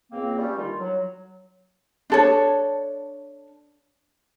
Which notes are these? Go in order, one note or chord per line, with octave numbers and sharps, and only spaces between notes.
C#2 A#3 C4
G3 A3 C#4
D3 D#3 G3 F4
F#3
D4 A4 C#5